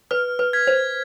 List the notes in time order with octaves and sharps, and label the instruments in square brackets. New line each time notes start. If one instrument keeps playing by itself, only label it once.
[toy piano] B4 [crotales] F6
[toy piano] B4
[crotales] G#6 B6
[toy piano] C5